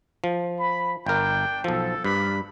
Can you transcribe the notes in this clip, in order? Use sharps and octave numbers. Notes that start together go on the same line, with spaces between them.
F3
B5
G1 D4 A#4 G5
B1 F3 A4
G2 A#3 D4 B5